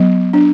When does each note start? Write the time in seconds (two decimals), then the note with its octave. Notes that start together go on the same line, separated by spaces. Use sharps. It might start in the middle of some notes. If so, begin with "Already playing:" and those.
Already playing: F#3 B3
0.33 D4